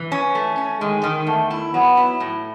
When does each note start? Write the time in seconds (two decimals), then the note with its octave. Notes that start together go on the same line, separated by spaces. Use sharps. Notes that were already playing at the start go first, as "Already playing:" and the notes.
Already playing: E3
0.12 C#4
0.35 A3
0.58 C#4
0.80 D#3 G#3
1.03 D#3
1.27 E2 A3
1.50 E4
1.74 F#3 B3
1.97 E4
2.20 A2